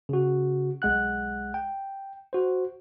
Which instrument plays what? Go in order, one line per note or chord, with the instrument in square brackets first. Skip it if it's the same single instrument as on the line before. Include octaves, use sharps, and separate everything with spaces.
[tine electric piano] C#3 F#4
B1 G#3 F#5 F#6
G5
F#4 C5